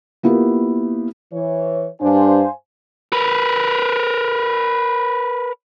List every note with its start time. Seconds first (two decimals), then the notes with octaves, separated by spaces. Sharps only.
0.23 A#3 B3 E4 F4 G4 A#4
1.33 E3 C#5
2.01 G2 D4 C5 F5 G#5
3.13 A#4 B4